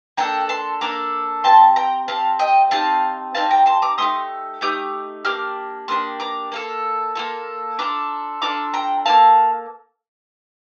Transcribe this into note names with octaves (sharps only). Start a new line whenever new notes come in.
A#3 D4 A4 G5 A#5
A5 C6
A#3 D4 A4 A#5 D6
C4 G4 A5 C6
G5 A#5
C4 G4 F5 A5
D#5 G5
C4 D#4 G4 F5 A5
C4 D#4 G4 F5 A5
G5 A#5
A5 C6
A#5 D6
A3 D#4 G4 C6 D#6
A3 D#4 G4 D#6 G6
A#3 D4 G4 D6 F6
A#3 D4 G4 C6 D#6
A#5 D6
A#3 F4 A4
A#3 F4 A4
D4 F4 A4 A#5 D6
D4 F4 A4 A#5 D6
G5 A#5
A#3 F4 A4 F5 A5